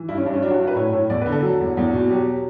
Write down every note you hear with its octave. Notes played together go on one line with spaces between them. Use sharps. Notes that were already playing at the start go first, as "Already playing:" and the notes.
Already playing: E3
G2 E4
C#4
G2 D4
C#4
F#3 D4
F#4
F#3
B4
A2 C#5
A2
E2 D5
B4
D3
A4
F#3
E2
E2
B2
F#3 G4